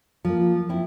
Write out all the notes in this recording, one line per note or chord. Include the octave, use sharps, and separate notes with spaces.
F3 A#3
C4 E4